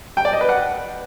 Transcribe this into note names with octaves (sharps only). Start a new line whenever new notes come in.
G5
D5
D#5
B4
F#5